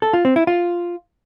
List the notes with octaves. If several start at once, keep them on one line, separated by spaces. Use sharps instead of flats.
A4
F4
C4
E4
F4